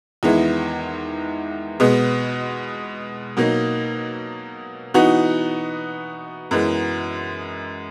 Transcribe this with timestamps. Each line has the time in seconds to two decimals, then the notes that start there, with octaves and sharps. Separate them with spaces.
0.23 E2 D#3 G#3 B3 E4
1.80 B2 G#3 B3
3.37 B2 F#3 A#3 D#4
4.94 E3 B3 D#4 F#4
6.51 F#2 E3 G#3 B3